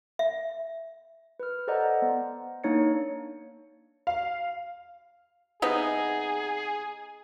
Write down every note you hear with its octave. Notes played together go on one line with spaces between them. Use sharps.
E5
B4 F6
A4 C5 D5 D#5 F#5 A#5
B3
A#3 D4 D#4 C#5 A6 C#7
F5
C3 B3 D#4 G#4